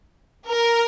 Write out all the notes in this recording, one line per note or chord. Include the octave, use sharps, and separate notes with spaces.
A#4